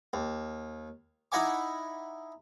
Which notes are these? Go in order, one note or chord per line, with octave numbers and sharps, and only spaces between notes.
D#2
D#4 E4 D#5 F#5 G#5 D6